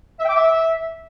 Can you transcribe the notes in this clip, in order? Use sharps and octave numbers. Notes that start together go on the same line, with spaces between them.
E5
G5
D6
E5